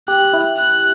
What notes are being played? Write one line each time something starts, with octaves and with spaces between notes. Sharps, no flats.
G4 F#6
E4
F#6